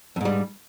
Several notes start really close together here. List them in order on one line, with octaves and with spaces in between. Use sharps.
F2 G#2 G3